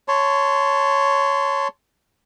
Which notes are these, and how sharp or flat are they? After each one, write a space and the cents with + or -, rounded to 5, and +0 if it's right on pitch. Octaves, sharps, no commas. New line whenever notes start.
C#5 +0 A5 +0 C6 -15